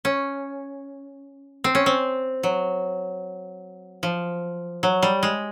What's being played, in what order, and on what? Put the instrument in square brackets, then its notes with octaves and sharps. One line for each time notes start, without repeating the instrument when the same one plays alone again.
[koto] C#4
C4
C#4
C4
F#3
F3
F#3
G3
G#3